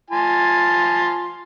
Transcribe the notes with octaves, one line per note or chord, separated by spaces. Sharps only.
F4 G#5 A5